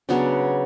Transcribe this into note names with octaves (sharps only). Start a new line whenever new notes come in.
C#3 F#3 B3 D4